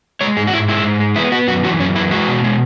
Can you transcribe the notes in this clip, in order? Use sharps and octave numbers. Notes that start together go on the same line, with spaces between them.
G#3 C#5
G#2 G#4
F#4
G#2 E4
G#3 E4
G#2
G#3
B3 E4
B3 F#4
F#2 F#4
E3 F#4
F#2 C#4
E3 E4
G#3 F#4
B2
G#3